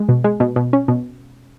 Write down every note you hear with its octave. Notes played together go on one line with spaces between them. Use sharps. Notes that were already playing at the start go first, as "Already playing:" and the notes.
Already playing: G#3
B2
G#3
B2
B2
C#4
B2